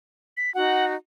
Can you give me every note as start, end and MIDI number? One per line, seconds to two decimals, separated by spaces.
0.37 0.53 95
0.55 0.95 63
0.55 0.95 66
0.55 0.85 78